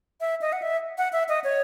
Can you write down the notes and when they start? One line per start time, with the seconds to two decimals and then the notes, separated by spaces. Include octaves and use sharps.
0.21 E5
0.41 D#5
0.53 F#5
0.62 E5
0.98 F#5
1.13 E5
1.29 D#5
1.44 C#5